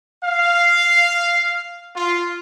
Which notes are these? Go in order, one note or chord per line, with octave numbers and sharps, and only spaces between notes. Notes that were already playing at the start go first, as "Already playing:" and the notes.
F5
F4